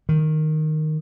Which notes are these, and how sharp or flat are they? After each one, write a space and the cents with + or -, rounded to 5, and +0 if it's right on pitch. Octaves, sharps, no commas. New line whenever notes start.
D#3 -5